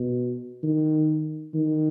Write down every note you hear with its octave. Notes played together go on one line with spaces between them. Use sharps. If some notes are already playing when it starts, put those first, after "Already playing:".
Already playing: B2
D#3
D#3